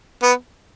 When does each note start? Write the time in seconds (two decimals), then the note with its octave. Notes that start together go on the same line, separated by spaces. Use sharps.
0.22 B3